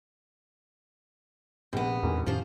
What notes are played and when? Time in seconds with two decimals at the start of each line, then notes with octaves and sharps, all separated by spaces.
1.73 A#1 C3 B3
2.03 A1 E2 D#3 G#3 C#4 D4
2.26 F2 A2 D#3 F3 C#4 F4 G4 C5